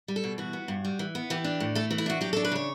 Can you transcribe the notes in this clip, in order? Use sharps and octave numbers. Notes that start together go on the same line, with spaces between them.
G3
A4
B2
E3 F#4
B3
G2
G3
E3
B3
E3 G4
D4
A2
A3 A4
E3
E4
D4 F#4
F#3 G4
A4
D4
B4
C#3 C#5